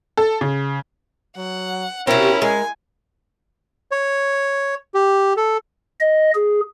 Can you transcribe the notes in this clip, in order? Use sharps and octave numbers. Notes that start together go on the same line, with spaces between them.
A4
C#3
F#3 F#5
C3 C4 C#4 E4 F#4 A#4
G#3 A#4 G#5
C#5
G4
A4
D#5
G#4